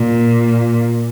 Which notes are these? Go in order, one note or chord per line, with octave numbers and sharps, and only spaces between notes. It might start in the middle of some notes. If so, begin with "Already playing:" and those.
Already playing: A#2